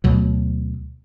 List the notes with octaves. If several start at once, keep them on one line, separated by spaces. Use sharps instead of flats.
D2 B2 F#3